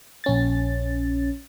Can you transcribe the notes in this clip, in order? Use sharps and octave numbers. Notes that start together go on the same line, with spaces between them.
A#1 C#4 A6